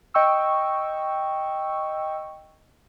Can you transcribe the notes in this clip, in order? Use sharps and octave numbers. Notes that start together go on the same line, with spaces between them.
D#5 G5 C#6 E6